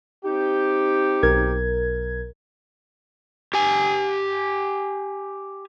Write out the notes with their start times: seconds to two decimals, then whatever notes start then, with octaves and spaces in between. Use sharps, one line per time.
0.24 C4 D#4 G4
1.23 B1 A#4 G#6
3.54 G4 G#5